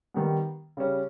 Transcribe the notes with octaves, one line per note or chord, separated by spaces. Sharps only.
D#3 G3 B3
C#3 G3 C#4